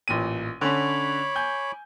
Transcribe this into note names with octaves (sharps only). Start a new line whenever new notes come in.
A1 A#2 D#7
D3 C#4 C#5 B5 D6
G#5 G6